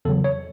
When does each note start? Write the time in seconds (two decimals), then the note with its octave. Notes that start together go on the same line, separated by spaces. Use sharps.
0.05 E2 C#3 F#3 A4
0.24 C#5